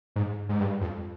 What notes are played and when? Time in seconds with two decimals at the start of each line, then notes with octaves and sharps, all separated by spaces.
0.16 G#2
0.49 G#2
0.60 G2
0.81 F2